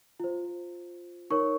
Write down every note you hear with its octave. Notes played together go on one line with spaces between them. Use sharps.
F4 C5
D#4 A#4 C#5 C#6